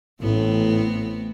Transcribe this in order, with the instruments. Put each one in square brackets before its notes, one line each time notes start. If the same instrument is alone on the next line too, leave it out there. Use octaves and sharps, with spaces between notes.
[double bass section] A1 [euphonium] A2 [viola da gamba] A3 B3 C4